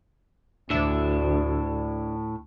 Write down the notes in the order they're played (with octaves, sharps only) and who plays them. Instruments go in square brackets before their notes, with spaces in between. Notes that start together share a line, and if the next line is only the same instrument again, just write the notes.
[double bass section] D2 [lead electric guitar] A2 E5 [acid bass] D4